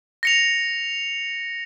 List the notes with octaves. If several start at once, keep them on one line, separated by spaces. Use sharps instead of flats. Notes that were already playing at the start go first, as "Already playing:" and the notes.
A#6 C#7 F7